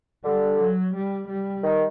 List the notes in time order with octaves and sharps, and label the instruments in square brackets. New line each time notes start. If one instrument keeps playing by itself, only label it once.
[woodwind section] D3 [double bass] G3
[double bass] F#3
G3
G3
[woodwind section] D#3